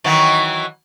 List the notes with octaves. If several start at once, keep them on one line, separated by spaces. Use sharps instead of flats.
D#3 E3 F#3